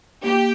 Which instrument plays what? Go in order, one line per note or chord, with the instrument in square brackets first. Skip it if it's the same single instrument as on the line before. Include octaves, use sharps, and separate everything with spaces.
[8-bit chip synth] A#3 [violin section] G4